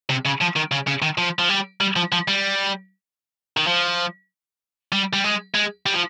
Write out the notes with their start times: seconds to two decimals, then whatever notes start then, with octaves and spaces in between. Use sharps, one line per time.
0.09 C3
0.25 C#3
0.41 F3
0.56 D#3
0.71 C#3
0.87 C#3
1.02 D#3
1.18 F3
1.39 F3
1.49 G3
1.81 G3
1.96 F3
2.12 F3
2.28 G3
3.57 D#3
3.67 F3
4.92 G3
5.13 G3
5.24 G#3
5.54 G#3
5.86 G3
5.94 F3